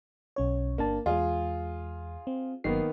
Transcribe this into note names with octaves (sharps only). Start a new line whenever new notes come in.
B1 C#4 C#5
G1 A#3 D4 A5
E2 G#3 F4 G#4
C4
G1 D#3 F#3 A#3 B3 C7